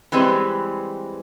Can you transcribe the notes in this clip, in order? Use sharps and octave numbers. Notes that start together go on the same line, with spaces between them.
E3 G3 G#3 C4 B4